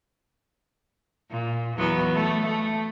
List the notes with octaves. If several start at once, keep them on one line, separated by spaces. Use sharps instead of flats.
A#2
E2 F#3 B3
A3
A3